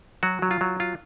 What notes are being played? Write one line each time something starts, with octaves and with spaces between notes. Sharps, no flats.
F#3 F#4
F#3
F4
F#3
F4